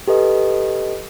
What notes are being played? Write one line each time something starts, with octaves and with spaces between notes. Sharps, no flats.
G4 A4 B4 D#5